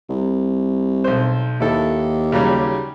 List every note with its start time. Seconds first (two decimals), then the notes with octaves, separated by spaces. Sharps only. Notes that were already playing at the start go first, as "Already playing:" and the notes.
0.09 C2
1.04 B1 C5
1.60 D#2 E4 A4
2.32 C#3 F#3 G3